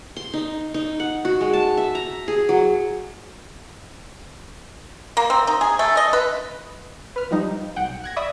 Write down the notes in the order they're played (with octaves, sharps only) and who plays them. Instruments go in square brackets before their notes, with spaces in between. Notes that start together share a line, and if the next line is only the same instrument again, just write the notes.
[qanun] C6
D#4
D#4
F#5
F#4
G#3
A5
E5
A#5
G#4
F#3
[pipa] A#3
C4
D#4
G#4
A3
D#5
B4
[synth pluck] B4 F6
F3 G3 D#4
B1 F#5 G5
F#6 G#6 A#6
D5 E5 B5 C#6 D#6